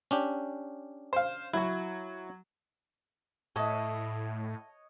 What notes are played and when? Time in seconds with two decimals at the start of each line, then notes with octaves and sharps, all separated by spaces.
0.11 C#4 D4 G4
1.13 C5 F5
1.54 F#3 E4 F#4
3.56 A2 A4 C#5 D#5 E5 F#5